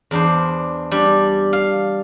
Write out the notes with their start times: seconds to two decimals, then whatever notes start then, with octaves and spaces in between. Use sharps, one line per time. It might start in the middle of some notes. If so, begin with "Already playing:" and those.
0.11 E2 D4 C5
0.91 G3 D4
1.53 F5